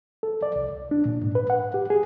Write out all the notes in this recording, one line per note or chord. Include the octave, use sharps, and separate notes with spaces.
A4
D5
C2
C#2
D4
A#2
G#2
B4
F#5
G4
G#4